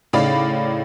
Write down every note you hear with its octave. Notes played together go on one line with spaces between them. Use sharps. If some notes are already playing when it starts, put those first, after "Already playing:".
A2 C#3 D#4 D5 F5 B5